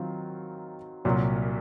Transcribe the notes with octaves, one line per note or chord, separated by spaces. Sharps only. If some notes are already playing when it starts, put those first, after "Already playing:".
Already playing: D#3 F#3 C4 F4
C2 A#2 F#3